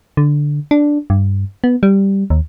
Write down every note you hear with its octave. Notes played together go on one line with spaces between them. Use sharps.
D3
D4
G2
B3
G3
D#2